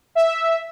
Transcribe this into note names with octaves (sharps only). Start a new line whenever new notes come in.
E5